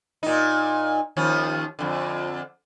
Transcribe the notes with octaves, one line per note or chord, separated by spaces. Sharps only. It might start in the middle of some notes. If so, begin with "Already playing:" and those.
A#2 D#4
D#2 F3 C#4
F2 D3